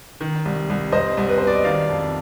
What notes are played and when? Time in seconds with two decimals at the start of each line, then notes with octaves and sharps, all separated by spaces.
0.21 D#3
0.45 C2
0.70 C2
0.92 C2 C5 D#5
1.17 C2
1.28 B4
1.38 B2 C5
1.47 D5
1.55 D#5
1.64 D#3 D5 F5
1.89 F2